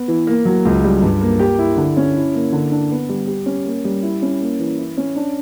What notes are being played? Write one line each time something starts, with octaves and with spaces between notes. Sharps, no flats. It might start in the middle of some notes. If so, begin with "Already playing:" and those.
Already playing: B3
E3
A#3
F#3
C#2
G3
G2
A#3
G4
E4
D3
C#4
E4
A#3
D3
D4
B3
G3
G4
C#4
A#3
G3
E4
C#4
A#3
E3
E4
C#4
D4